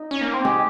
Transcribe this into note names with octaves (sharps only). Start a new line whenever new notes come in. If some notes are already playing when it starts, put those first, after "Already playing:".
Already playing: D#4
C#4
A#3
C4
G#3 G4